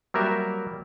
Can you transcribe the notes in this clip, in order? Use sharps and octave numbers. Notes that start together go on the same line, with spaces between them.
F#3 G3 A#3 A#4 E5